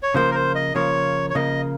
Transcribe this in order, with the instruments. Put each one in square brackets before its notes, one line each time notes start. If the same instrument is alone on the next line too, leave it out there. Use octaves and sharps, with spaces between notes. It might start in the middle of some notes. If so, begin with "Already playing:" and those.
[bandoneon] C#5
[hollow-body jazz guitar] C#3 F3 A#3 [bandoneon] C5
[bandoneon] A#4
C5
D#5
[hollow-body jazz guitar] C#3 F3 A#3 [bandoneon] C#5
[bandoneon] C#5
[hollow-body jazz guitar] C#3 F3 A#3 [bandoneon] D#5